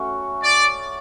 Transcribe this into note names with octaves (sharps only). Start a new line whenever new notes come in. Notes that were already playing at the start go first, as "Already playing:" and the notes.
Already playing: A3 C#4 F#4 C#5
D5